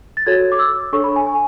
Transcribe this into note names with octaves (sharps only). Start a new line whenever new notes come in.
A6
F#4 A4 C#5 G#6
D6
E6
D4 A4 C#5 C#6
B5
G#5
G#5